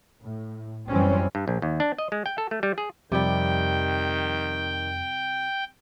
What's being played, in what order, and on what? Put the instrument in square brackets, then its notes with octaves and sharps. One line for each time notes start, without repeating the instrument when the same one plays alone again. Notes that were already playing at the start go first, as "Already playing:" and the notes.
[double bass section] A2
F#2 E3 G3 C4 C#4
[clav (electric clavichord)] G2
A#1
D#2
D4
D#5
G#3
G5
A4
A3
G3
G#4
[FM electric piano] F2 [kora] C3 G3 [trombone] D#3 [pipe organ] G5